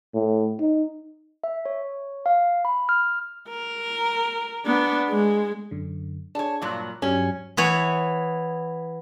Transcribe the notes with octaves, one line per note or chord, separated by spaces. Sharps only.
A2
D#4
E5
C#5
F5
B5
F6
A#4
B3 D4
G#3
F#2 D3
D4 G#4 C#5 A5
G2 A#2 F#3 D5 F#6
G2 F#3 G3 C#4
E3 B3 C#5